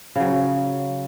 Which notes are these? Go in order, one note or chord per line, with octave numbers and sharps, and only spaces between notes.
C#3 F#3